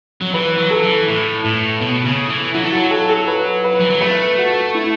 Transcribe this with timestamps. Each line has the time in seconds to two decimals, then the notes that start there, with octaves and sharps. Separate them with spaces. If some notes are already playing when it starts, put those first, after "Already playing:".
0.22 F#3
0.34 E3 B4
0.58 F#3
0.71 A4
0.83 E3
1.08 A2
1.44 A2
1.81 B2
2.05 C#3
2.29 E3
2.54 F#3 E4
2.64 A3
2.72 F#3 F#4
2.91 A4
3.09 A4
3.27 B4
3.64 B4
3.79 E3
3.90 F#3
4.01 A3 B4
4.38 F#4
4.75 E4